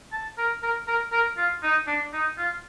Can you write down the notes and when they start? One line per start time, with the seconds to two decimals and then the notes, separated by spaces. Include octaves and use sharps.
0.12 A5
0.38 A#4
0.63 A#4
0.88 A#4
1.12 A#4
1.37 F4
1.63 D#4
1.87 D4
2.13 D#4
2.38 F4